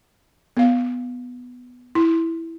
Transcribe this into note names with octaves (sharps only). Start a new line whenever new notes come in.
B3 F5
E4